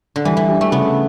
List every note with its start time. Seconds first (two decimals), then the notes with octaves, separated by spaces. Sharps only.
0.16 D3
0.25 E3 G3
0.37 E3
0.49 D4 G4
0.61 A3
0.72 C#3 B3